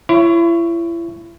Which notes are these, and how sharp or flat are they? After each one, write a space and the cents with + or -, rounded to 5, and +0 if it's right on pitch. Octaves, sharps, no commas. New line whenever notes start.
E4 +35 C#5 +0